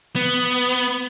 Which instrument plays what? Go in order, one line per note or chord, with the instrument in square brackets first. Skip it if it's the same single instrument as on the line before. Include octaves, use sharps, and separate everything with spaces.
[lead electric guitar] B3